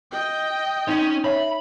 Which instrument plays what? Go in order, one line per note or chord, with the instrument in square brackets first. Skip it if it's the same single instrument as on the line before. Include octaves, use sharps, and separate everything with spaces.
[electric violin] D#5 G5
[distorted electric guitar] C#4 C#5 [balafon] D#4
[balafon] C#5 E5 [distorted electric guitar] B5